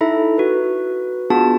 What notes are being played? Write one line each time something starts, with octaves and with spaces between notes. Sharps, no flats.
D#4 E4 A4 E5 A#5
F#4 B4
B3 D4 F4 F#4 G#4 A5